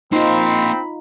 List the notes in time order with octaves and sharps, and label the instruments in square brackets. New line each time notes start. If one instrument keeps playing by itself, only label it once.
[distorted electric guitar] A#3 C5 [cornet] C4 [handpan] D#4 F4 [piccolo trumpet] B5